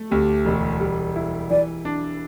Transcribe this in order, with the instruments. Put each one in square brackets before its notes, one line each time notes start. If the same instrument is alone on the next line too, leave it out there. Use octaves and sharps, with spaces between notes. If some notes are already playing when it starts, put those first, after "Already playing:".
Already playing: [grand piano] A3
[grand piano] D2 [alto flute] G4
[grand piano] E1
G3
E4
[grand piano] E3 [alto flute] D5
[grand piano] D4